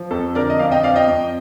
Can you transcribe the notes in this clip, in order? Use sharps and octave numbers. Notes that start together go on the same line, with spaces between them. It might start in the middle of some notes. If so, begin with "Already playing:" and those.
Already playing: F3
F2 A4
D3 A#4 D5
D#5
F2 D5 F5
D#5 G5
F3 D5 F5
D#5 G5
F2